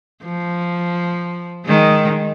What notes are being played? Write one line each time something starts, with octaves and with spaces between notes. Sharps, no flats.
F3
D#3 G#3